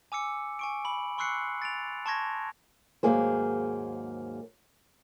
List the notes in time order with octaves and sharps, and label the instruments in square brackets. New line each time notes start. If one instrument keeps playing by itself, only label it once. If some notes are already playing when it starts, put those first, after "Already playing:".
[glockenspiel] G#5 D6 E6 C#7
G#5 C#6 D7
B5 F#7
C6 C#6 E6 F#6 C7 C#7
A6 D7 F7
A5 C6 C#6 G#6 A#6
[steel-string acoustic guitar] D#2 G#2 F#3 A#3 G#4 C5